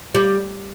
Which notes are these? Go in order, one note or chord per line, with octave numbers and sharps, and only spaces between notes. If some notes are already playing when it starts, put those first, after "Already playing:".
G3